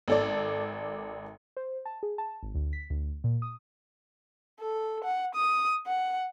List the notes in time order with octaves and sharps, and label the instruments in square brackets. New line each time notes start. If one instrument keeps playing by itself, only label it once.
[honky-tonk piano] G#1 A4 D5
[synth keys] C5
A5
G#4
A5
G#1
D2
B6
D2
A#2
D#6
[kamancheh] A4
F#5
D#6
F#5